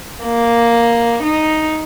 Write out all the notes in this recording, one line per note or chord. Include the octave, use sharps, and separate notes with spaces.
A#3
D#4